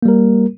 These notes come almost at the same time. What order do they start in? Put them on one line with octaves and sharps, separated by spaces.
A#3 G3 A#4